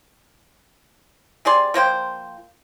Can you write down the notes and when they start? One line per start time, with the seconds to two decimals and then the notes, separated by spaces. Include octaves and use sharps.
1.45 C3 G#4 D5 C6
1.74 F3 A#3 C5 G5